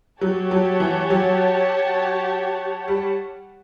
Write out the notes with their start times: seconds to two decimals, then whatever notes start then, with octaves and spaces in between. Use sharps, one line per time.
0.21 F#3 G4 C#5 F#5 A5
0.51 F#3
0.80 E3
1.10 F#3
2.88 G3